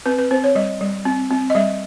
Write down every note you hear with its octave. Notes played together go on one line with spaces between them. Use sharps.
C4 B4
B4
C4 C5
C#5
G3 D#5
G3
C4
C4
D#5
G3 E5